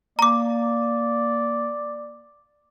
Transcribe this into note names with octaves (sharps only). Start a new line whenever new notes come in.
A#3 D5 A#5 D6